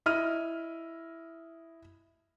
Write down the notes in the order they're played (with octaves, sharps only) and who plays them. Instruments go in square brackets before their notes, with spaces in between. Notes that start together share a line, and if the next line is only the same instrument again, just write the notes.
[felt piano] E4 D#5 F6 D#7